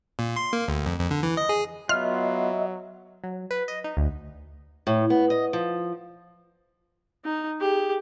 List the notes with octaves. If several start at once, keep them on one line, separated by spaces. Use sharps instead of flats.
A#2
C6
A#3
D2
F2
F2
D3
E3
D#5
G#4
F#3 B3 F4 D#5 E5 F6
F#3
B4
D#5
D#4
D2
A2
B3
D#5
F3
D#4
G4 G#4